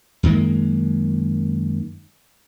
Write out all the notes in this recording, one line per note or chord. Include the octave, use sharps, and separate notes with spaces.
F#2 D#3 G#3 A#3